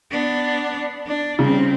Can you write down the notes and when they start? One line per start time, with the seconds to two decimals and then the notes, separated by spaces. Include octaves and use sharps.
0.11 B3 D4
1.06 D4
1.39 C#3 G3 C4